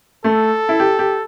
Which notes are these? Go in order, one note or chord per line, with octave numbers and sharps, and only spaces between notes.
A3 A4
E4
G4
G4